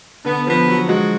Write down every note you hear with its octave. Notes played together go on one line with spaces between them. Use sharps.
D3 B3
F3 B3
F#3 F#4
G#3 F#4